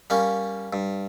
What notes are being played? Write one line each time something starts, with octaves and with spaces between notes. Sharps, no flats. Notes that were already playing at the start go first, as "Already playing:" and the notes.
G3 A#3 C#4
G2